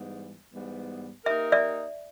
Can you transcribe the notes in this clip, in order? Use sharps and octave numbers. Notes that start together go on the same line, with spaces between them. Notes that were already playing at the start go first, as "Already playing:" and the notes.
Already playing: G#2 E3 G3 B3
G#2 E3 G3 B3
A#3 D#4 G4 A#4 E5
D5 E5